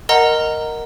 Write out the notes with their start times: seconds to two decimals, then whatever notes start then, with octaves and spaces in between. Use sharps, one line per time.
0.09 A#4 D#5 F#5 A#5